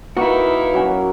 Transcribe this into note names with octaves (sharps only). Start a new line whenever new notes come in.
A#3 D#4 E4 F#4 B4
F#3 C#4